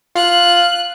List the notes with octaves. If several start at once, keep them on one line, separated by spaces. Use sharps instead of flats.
F4 F#6